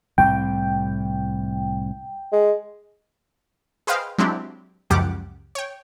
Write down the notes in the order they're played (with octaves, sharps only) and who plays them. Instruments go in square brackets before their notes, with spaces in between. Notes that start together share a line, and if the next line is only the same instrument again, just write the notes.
[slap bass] C2 A2 C3 [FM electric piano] G5
[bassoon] G#3
[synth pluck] G#4 B4 C5 D#5 F5 G5
F#3 G#3 C4 D4 E4 G4
C#2 F#2 F3 G4 F#5 D6
C#5 G5